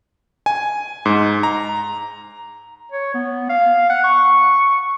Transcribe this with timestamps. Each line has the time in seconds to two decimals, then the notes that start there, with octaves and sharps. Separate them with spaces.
0.46 G#5
1.06 G#2
1.43 A#5
2.92 C#5
3.14 B3
3.49 F5
3.90 F#5
4.04 C#6